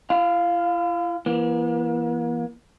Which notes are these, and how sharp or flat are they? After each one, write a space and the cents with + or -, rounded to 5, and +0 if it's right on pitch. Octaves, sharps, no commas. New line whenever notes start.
E4 +45 F5 +0
E3 +25 A#3 +45